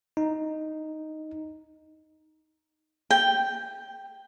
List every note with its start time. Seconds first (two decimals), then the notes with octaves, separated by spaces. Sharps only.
0.17 D#4
3.10 G5